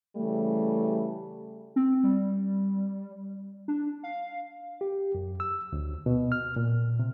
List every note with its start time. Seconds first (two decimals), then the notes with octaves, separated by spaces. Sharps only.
0.17 C#3 E3 G3 A3
1.76 C4
2.03 G3
3.68 D4
4.03 F5
4.81 G4
5.15 F#2
5.40 E6
5.73 D2
6.06 B2
6.32 F6
6.56 A#2
6.99 C3